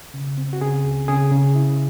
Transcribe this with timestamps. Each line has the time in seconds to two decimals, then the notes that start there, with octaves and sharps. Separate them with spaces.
0.14 C#3
0.38 C4
0.53 F#4
0.61 C#3 G#4
0.85 C#2
1.08 C#3 G#4
1.32 C#3
1.55 E4